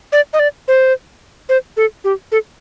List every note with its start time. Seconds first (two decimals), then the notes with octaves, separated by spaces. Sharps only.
0.12 D5
0.33 D#5
0.39 D5
0.68 C5
1.49 C5
1.77 A4
2.04 G4
2.32 A4